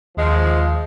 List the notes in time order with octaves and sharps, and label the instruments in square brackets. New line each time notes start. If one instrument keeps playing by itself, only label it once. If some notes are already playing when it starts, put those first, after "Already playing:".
[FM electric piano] D#2 [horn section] F3 G#3